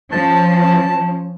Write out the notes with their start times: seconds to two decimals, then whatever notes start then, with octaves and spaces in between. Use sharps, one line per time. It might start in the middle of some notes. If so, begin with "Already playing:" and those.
0.12 F3 C#4 A5